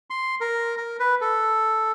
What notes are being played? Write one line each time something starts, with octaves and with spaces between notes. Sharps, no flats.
C6
A#4
A#4
B4
A4